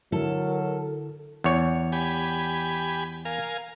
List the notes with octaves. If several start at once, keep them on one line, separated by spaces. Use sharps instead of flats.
D3 F#3 E4 A4 A#4
E2 C#5
G4 G#5 B5
A#4 F5 G#5